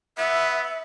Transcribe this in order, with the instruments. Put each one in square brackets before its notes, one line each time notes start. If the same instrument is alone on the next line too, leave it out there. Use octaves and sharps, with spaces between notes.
[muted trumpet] B3 [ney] E5